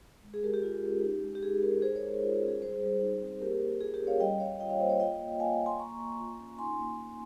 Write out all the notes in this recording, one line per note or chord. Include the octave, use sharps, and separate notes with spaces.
G#3
G#4
G#3 G4 A#4
G4
F4
C#4
D#4
G#3
G4
G#3 G#4
D#4 G4 A#4
G#3 G#4 C5
A#4 C#5
G#3
G#4
F4
G#4
C#4
G#4
G3 G#4 C5
G3
D#4
C4
A#3 G4 A#4
A#3
F4 G#4
G4 A#4
C#4
C#5 F5
G3 D#5 G5
G3 C#5 F5
F4 D#5 G5
C#5 F5
A#3 C5 D#5
C#5 F5
F4 D#5 G5
A#3
A#3 F5 G#5
F4
G#5 C6
A#3 A#5 C#6
A#3
F4
C#4
D#4 G#5 C6
A#3
A#3